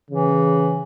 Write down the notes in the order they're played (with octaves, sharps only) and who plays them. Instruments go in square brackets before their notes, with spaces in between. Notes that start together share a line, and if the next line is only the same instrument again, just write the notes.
[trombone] C#3 [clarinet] E3